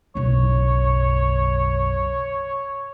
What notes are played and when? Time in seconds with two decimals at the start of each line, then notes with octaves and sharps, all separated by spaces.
0.15 F#1 B1 C#5